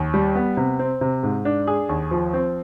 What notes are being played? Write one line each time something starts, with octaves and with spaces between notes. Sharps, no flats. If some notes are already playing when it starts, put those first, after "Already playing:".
Already playing: D#2
G3
B3
C3
C4
C3
G#2
D4
G#4
D#2
F3
C4